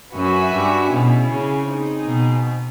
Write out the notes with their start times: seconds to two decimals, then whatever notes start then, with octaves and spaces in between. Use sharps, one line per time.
0.15 F#2 F#4 B4 E5 G#5
0.54 G2
0.92 B2 C#4 E4 G#4
1.30 C#3
1.68 C4 D#4 G#4
2.06 B2